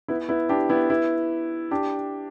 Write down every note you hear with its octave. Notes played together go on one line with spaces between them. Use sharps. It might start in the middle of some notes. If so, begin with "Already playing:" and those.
B3 E4
B3 E4
D4 G4
B3 E4
B3 E4
D4 G4